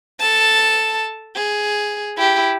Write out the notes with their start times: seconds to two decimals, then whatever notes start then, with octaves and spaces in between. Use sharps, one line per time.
0.20 A4 A5
1.35 G#4
2.17 E4 G4